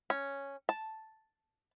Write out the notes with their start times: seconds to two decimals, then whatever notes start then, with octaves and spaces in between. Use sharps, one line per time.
0.10 C#4
0.69 A5